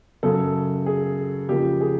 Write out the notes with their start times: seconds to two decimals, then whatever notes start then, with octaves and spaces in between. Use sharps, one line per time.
0.23 F#2 C#3 F#3 A4
0.86 G#4
1.49 F2 C#3 F3 A#3 G4
1.81 G#4